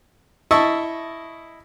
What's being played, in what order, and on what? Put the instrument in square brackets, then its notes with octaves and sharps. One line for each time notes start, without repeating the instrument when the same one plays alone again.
[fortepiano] E4 D#5 A5 C#6 E6